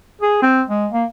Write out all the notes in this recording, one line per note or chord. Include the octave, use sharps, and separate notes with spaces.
G#4
C4
G#3
A#3